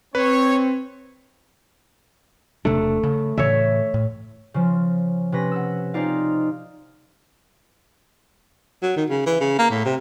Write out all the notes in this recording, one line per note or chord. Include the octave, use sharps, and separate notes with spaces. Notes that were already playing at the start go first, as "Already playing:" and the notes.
C4 B4 C#5
E1 C3 A3 D4
C#3
A2 C#3 E3 C#5 E5
A2
C#3 F3
C3 C#4 B4 A#6
F#5 E6
C4 D#4 F4 G#4 D5 F5
F#3
D#3
C#3
E3
C#3
A#3
A2
C3